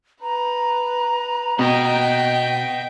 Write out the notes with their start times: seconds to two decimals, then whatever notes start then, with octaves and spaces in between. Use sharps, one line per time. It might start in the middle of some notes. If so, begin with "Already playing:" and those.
0.22 B4 A#5
1.59 B2 D#5 F#5 G5